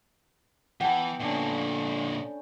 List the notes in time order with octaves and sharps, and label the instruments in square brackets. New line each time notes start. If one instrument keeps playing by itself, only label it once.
[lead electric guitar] E3 [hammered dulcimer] B3 [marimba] F#5 A5 [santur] G5
[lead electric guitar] A#2 D3 [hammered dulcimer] A3 C#4 D4